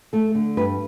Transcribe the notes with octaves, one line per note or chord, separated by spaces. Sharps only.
A3 A4
D3
G2 B4